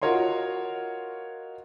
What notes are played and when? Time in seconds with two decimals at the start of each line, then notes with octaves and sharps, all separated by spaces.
0.02 F4 F#4 A#4 C#5 D#5 C6